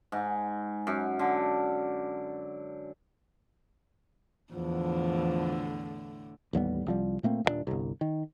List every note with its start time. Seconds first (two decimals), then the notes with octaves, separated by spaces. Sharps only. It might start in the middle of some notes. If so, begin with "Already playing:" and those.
0.12 G#2
0.87 F#2
1.19 D3
4.54 E2 A2 D3 F3
6.53 A1 D#2 G3 B3
6.86 C2 F3 G3
7.23 A#2 A3 A#3 C4
7.45 D#1 G2 A#2 D4
7.67 G1 C2
8.01 D#3